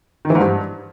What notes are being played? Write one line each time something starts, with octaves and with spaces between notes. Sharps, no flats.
D#3
E3
G#2
G2